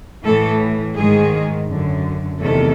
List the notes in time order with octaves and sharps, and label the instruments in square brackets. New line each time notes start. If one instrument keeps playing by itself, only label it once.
[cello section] A2 E3 A3 A4
G#2 D#3 G#3 G#4
F#2 D3
E2 C3 D#3 A3 A4